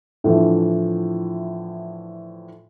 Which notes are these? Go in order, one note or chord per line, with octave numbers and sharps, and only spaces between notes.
A2 D3 E3 F3